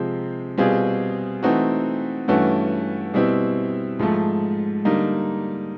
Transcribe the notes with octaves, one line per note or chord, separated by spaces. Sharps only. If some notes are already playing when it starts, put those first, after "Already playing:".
Already playing: C3 F3 G#3 C4
B2 G3 C4 F4 G#4
E3 A3 C4 D#4 F#4
G2 E3 A3 C#4 F#4
B2 G3 C4 E4
G#2 F3 A3
D3 G3 A#3 D#4